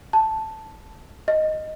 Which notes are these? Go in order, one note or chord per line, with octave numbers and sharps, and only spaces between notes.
A5
D#5